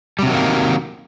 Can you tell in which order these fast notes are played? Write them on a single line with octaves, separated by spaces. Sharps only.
G3 C3 F#3 D#3 A#3